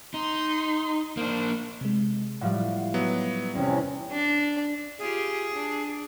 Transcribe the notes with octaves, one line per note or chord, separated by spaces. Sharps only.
D#4 C6
A#3 D4 C5
C3 G#3
A2 F3 G3 F5 F#5
F#3 B3
E2 C3 C4 C#4
D4
F4 G4 G#4
D4